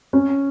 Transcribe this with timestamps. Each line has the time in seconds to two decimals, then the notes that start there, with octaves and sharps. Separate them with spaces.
0.13 C#4